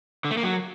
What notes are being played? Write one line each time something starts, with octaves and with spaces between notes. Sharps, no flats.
D3
A3
A#3
F#3